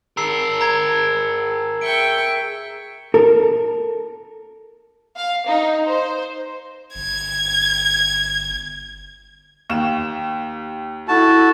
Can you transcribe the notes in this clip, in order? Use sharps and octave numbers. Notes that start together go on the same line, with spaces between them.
G#4 A#4 E6 C7
A#5 G#6
E5 G5 C#6 D7 G7
A4 A#4
F5
D#4
C5
G1 G#6
D#2 E7
E4 F#4 A4 A5